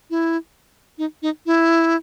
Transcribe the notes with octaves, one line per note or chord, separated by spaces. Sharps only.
E4
D#4
D#4
E4